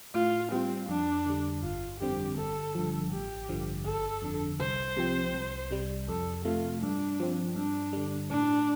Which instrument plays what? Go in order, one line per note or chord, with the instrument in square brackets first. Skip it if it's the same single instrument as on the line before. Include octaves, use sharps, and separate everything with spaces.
[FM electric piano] A2 [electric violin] F4
[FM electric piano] G3 F4 [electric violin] C4
[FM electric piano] F2 [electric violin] D4
[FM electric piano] D3 G3
[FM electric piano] G1 [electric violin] F4
[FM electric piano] F2 D3 G3 C4 [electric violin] G4
[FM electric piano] G1 [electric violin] A4
[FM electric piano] G2 D3 F3
[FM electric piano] A1 [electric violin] G4
[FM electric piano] G2 D3 F3
[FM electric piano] G1 [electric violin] A4
[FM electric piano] F2 D3
[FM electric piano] C2 [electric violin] C5
[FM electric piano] C3 F3 C4
C2
C3 G3
[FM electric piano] F2 [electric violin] A4
[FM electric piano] C3 A3 [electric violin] F4
[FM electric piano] G2 [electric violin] D4
[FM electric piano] F3 C4
[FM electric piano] G2 [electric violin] D4
[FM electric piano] D3 G3
[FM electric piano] A2 [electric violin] D4